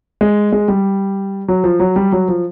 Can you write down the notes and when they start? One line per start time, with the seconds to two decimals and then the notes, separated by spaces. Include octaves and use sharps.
0.21 G#3
0.52 G#3
0.68 G3
1.48 F#3
1.64 F3
1.80 F#3
1.96 G3
2.12 F#3
2.28 F3